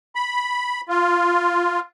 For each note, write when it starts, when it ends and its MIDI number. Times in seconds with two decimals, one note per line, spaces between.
0.15 0.81 83
0.89 1.80 65